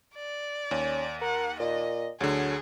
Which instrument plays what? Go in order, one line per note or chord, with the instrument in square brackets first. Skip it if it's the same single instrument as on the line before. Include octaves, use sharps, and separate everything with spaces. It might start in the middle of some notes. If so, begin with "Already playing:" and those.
[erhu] D5
[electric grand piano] D#2 [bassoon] C#4
[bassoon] A#4 [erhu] F#5
[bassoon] A#2 [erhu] D#5
[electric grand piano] D2 D3 [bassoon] F#3 [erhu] G#4